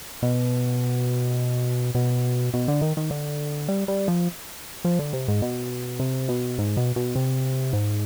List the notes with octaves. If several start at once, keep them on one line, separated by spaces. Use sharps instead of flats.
B2
B2
B2
D3
D#3
D#3
D3
G3
G3
F3
F3
D3
C3
G#2
B2
C3
B2
G#2
B2
B2
C3
G#2